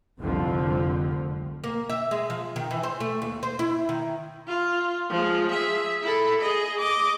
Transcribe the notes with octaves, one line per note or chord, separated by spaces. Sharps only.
F1 C2 F2 D3 F3
A#3
E5
G#3
F3
D#3
E3
C5
A3
D#2
C5
E4
D#3
F4
F3 G#3
G#4 E5
E4 A4
G#4 D#5
D#5 D6